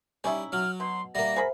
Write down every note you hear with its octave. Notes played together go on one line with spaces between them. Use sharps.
G3 C#4 D#4 E4
F#3 F6
B2 C6
G3 A#3 E5 F#5 A#6
G#4 A#4 C5 B5